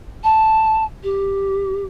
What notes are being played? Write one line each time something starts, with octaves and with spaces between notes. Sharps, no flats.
A5
G4